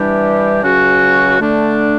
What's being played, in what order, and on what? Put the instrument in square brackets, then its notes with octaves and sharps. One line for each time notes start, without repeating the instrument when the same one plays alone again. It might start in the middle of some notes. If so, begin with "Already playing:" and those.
Already playing: [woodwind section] E3 G3 D4 G4
C#2 C#3 F#3 C#4 F#4
D3 A3 D4